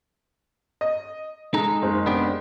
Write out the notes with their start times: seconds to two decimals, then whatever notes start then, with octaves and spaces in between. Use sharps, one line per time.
0.81 D#5
1.54 G#3 D#4 A4 A#5
1.82 F#1 G#3 C4
2.06 B3 D4 G4